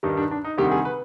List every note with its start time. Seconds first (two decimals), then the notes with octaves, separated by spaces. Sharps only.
0.03 G2 D#3 G3 D#4
0.17 D4
0.31 D4
0.44 D#4
0.58 D2 C3 D#3 G3 G4
0.72 G#4
0.85 B4